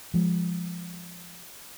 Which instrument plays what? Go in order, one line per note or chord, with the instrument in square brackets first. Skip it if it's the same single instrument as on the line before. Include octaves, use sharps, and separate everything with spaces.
[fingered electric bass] F3 G#3